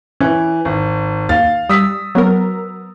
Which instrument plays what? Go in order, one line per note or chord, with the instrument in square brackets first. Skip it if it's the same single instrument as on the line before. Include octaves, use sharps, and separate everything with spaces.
[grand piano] E3 [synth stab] C#4
[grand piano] G#1
[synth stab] D#2 [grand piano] F5 A6
[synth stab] G3 [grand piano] D#6 E6 B6
[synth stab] F#3 B3 A#4